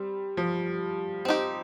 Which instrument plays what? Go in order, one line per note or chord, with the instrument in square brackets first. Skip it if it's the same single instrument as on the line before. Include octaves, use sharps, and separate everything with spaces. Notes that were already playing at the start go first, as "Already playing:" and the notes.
Already playing: [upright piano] G3 [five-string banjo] C4
[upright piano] F3
[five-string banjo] C4 D#4 G4